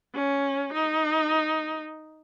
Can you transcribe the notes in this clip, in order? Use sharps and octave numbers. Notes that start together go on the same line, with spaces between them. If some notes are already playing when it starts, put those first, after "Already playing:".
C#4
D#4